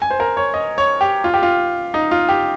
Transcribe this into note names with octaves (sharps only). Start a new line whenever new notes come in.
G#5
C5
A#4
C#5
D#5
C#5
G4
F4
G4
F4
D#4
F4
G4